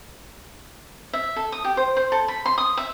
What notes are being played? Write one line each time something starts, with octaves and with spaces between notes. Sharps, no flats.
E5
A4
D#6
G4
C5
C5
A4
B5
C6
D#6
E5